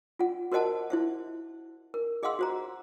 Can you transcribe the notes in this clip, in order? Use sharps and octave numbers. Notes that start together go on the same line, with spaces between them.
F4 F#5
F#4 A#4 C5 D#5 F#5 A5
E4 C5 E5
A#4
G#4 D#5 F5 F#5 C6 E6
F#4 C5 A#5